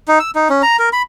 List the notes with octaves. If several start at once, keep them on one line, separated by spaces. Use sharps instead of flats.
D#4
E6
D#4
C#4
A#5
A#4
B5